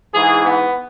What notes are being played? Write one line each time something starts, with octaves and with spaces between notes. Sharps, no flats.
G#2 E3 G#4
B3